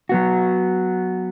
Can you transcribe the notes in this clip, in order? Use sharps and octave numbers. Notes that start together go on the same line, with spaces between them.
F#3 B3 F#4